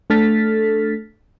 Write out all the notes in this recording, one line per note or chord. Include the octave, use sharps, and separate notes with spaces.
A3 D4 A4 F6 A6 B6